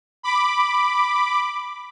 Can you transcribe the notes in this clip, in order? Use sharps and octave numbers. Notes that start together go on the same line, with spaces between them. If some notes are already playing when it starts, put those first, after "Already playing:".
B5 D6